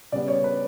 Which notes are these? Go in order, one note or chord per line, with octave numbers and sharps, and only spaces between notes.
C#3 G3 B3 D5
C#5
B4